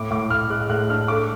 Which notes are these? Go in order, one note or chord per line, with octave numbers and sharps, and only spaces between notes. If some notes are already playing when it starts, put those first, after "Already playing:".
Already playing: A2 D6
A2 D6
A2 F6
G#3 F#6
A2 F#6
D4 F6
A3 D6